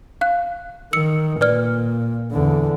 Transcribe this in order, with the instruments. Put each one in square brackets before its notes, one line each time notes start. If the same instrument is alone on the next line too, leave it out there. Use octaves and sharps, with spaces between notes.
[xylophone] F5 F#6
[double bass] D#3 [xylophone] E6 C#7
[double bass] A#2 [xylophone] B4 D5 F6
[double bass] E2 D3